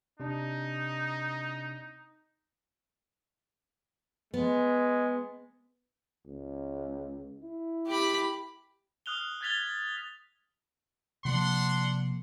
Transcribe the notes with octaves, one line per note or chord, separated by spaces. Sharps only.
C3 D4 D#4
G#3 B3
C#2
E4
G4 B5
D#6 F6 F#6 F7 G7
F#6 G#6 A6 B6 F7 G7
C3 F3 A#3 D4 F#5 C6